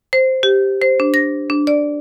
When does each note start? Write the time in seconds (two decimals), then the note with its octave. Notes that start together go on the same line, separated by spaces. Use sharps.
0.13 C5
0.43 G4
0.82 C5
1.00 D4
1.14 A#6
1.50 D4
1.67 D5